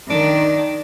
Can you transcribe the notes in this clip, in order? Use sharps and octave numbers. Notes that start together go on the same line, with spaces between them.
D#3 D4